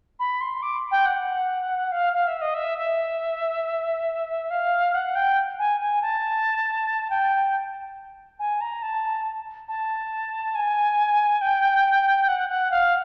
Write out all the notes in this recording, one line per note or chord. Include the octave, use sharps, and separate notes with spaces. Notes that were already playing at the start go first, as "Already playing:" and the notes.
B5
C6
D6
G5
F#5
F5
F5
E5
D#5
E5
E5
F5
F#5
G5
G#5
G#5
A5
G5
G#5
A#5
A5
A5
G#5
G5
F#5
F#5
F5